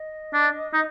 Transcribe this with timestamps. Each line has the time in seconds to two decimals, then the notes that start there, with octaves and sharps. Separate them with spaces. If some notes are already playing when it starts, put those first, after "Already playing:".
Already playing: D#5
0.34 D4
0.73 D#4